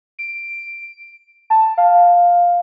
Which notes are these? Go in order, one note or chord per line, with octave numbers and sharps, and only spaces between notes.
D7
A5
F5